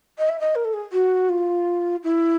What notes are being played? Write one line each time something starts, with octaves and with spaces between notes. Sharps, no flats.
D#5
E5
D#5
A#4
A4
G#4
F#4
F4
E4